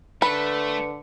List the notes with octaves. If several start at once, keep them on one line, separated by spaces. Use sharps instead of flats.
D3 A3 B4